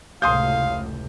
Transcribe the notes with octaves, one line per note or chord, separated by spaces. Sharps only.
F1 C#2 A2 F5 C6 D#6 G6